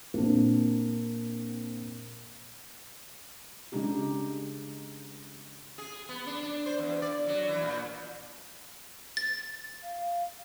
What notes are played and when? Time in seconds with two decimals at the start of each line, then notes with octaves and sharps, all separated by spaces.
0.14 A#2 A#3 C4 D4
3.72 C#3 G#3 D4 D#4 G4
5.78 G#4
6.09 B3
6.26 D4
6.43 D4
6.66 C5
6.78 E2
7.02 D5
7.27 F#3
7.48 E3
7.63 A#2
9.17 A6
9.82 F5